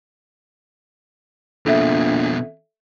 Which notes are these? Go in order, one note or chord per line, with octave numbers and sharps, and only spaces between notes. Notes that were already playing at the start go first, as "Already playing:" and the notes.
A#1 F2 B2 A4 E5